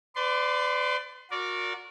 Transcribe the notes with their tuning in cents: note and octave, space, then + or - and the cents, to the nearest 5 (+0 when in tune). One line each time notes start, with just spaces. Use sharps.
B4 +40 D5 +0 C6 +0
F#4 -30 A#4 +0 D5 -20